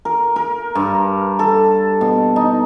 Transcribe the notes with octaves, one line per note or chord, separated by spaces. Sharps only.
A#4
A#4
G2
A4
B2
D#4